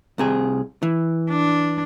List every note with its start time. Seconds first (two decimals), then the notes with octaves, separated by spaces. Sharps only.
0.18 C2 C3 G#4
0.83 E3
1.30 D4